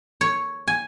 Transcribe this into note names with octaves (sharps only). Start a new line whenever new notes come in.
C#5
G#5